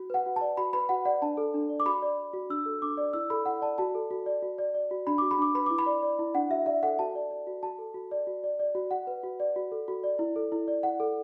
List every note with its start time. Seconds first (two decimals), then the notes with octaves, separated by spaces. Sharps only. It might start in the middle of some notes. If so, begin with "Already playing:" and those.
Already playing: F#4
0.10 B4 F#5
0.26 F#4
0.36 D5 A5
0.57 F#4 B5
0.73 B4 B5
0.89 F#4 F#5
1.05 D5 F#5
1.22 D4 A5
1.37 A4
1.54 D4
1.69 D5
1.80 D6
1.85 F#4 B5
2.02 D5
2.18 D5
2.33 F#4
2.50 D4 E6
2.66 A4
2.82 D4 D6
2.97 D5
3.13 E4 E6
3.30 A4 B5
3.45 E4 F#5
3.62 D5 A5
3.78 F#4 A5
3.95 A4
4.11 F#4
4.26 D5
4.42 F#4
4.58 D5
4.74 D5
4.91 F#4
5.07 D4 B5
5.18 F#4 D6
5.31 B5
5.38 D4 D6
5.55 B4 B5
5.66 E4 D6
5.78 B5
5.86 D5
6.03 D5
6.19 E4
6.34 D4 F#5
6.50 F#4 E5
6.66 D5 E5
6.83 A4 F#5
6.99 F#4 A5
7.15 D5
7.31 D5
7.47 F#4
7.63 F#4 A5
7.78 A4
7.94 F#4
8.11 D5
8.27 F#4
8.44 D5
8.59 D5
8.75 F#4
8.91 F#4 F#5
9.07 B4
9.23 F#4
9.40 D5
9.56 F#4
9.72 A4
9.88 F#4
10.03 D5
10.19 E4
10.36 A4
10.52 E4
10.68 D5
10.83 E4 F#5
11.00 A4